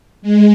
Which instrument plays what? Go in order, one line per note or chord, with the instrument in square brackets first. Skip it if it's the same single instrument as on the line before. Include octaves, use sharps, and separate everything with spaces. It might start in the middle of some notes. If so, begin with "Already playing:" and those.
[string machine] G#3